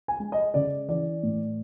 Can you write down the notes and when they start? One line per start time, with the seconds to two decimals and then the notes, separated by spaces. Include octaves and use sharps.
0.08 G#5
0.20 G#3
0.32 D#5
0.54 C#3 D5
0.88 E3 D5
1.23 A2